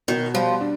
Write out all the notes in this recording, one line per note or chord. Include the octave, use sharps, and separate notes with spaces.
B2 D#3
F3 G3
D4